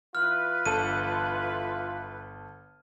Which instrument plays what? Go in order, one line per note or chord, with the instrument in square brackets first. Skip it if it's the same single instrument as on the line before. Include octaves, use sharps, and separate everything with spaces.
[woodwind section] E3 B4 [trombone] F4 [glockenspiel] F6
[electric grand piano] G1 A4 [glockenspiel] D#7